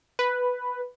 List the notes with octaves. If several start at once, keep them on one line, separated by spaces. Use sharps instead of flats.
B4